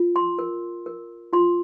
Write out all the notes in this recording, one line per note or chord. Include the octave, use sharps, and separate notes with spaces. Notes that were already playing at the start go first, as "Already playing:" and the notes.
Already playing: F4
C6
A#4
A#4
F4 C6